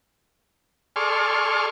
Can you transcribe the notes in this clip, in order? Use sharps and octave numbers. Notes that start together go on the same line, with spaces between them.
G#4 A4 D5 C6 C#6 F6